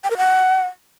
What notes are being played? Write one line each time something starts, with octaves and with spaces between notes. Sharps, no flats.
G5
A#4
F#5